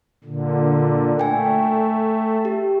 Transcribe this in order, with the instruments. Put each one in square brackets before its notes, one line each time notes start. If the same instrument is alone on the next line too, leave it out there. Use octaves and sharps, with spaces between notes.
[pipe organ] A#2 D3
[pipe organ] A3 [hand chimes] G5 G#5
[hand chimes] G4